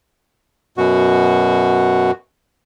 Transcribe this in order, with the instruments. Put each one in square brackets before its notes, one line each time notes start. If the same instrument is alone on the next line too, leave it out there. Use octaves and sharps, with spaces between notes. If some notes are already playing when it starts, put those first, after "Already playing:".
[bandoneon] F#2 B2 F#4